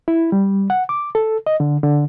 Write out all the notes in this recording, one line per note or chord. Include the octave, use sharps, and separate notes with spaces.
E4
G3
F#5
D6
A4
D#5
D3
D3